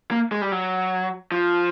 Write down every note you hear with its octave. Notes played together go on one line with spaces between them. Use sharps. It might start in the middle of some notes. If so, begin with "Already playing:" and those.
A#3
G#3
G3
F#3
F3